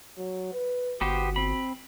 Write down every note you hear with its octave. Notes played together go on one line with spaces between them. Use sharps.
F#3
B4
G1 B3 F#4 G4 C5
C4 B5